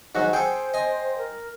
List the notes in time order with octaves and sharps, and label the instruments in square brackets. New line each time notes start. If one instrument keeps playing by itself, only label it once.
[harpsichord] G#2 D#3 F#3 [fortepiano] F#4
[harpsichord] G#4 A4 [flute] C5 [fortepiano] G5
[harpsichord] D#5 G#5
[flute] A#4